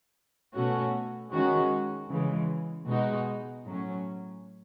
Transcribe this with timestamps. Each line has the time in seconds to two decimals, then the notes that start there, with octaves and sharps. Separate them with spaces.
0.55 B2 A3 C#4 F#4
1.32 D#3 G#3 C#4 F#4
2.09 C#3 E3 G#3
2.87 B2 G#3 D#4 F#4
3.65 A2 F#3 C#4